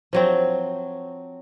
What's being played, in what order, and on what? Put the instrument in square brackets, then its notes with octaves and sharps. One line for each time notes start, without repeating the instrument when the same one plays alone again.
[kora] F3 F#3 C4